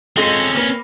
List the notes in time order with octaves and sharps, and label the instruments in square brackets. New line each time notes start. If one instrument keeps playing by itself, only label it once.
[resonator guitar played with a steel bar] G#3 F4 A4 [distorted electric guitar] C4 C#4
[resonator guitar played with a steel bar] A#3 B4